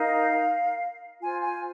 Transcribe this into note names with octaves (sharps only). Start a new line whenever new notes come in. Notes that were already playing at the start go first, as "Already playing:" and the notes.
Already playing: D#4 A#4 F5
F4 C5 G#5
G#5